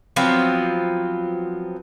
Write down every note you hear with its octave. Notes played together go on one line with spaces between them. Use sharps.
F3 F#3 B3 C4